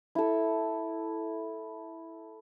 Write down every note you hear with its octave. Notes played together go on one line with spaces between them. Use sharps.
E4 A4